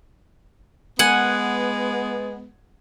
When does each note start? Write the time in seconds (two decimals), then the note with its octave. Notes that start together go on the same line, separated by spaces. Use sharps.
0.99 G#3 B3 F#5 G#5